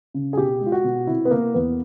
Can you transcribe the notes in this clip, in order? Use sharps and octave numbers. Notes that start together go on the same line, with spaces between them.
C#3
G#4
B2 G4
G#3
F4
F#4
B2
C3 E4
B3
C3 A#3
E2 B3